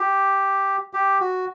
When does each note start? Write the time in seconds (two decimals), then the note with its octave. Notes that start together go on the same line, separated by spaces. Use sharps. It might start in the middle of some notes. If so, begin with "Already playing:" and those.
Already playing: G4
0.93 G4
1.20 F#4